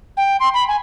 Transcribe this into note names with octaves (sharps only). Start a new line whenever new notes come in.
G5
C6
B5
G#5